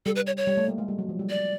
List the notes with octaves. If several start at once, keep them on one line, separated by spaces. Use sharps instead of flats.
G3 A4
B4
C#5
C#5
G3
A3
A#3
G#3
G3
F#3
F3
G3
D5